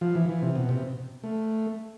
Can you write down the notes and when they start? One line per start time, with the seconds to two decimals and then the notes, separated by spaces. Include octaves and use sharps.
0.01 F3
0.15 E3
0.29 E3
0.42 C3
0.55 B2
0.69 C3
1.24 A3